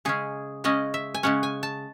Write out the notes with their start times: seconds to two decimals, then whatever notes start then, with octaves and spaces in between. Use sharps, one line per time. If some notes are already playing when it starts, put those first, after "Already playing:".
0.05 C#3 G#3 C#4 G#4
0.64 C#3 G#3 C#4 D#5
0.94 E5
1.14 G#5
1.23 C#3 G#3 C#4 F#5
1.43 G#5
1.63 A5